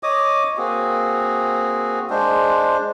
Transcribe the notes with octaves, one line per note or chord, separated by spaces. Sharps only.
C#5 D#5 D6 D#6
A#3 C4 F#4 G#4
G#3 D4 C5